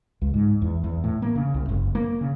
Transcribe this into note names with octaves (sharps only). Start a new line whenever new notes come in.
C#2
G#2
E2
E2
A2
A#3
C#3
C2
F#1
A#3
C#3